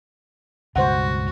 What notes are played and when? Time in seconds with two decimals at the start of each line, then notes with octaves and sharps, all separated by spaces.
0.76 C#2 G2 B2 F#4 C5 F#5